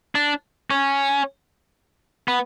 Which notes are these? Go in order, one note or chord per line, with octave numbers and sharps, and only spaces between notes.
D4
C#4
B3